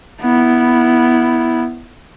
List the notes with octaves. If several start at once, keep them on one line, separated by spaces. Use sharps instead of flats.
B3 E4